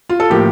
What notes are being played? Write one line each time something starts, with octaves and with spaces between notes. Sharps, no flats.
F4
A4
A2 F3 A#3 G4